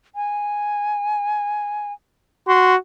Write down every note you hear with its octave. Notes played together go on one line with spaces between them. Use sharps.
G#5
F#4 C6